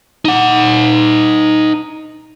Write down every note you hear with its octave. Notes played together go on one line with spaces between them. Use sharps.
D#4 F#5